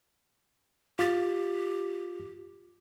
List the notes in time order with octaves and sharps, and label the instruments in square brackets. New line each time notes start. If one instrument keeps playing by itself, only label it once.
[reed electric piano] F4 A6 [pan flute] G4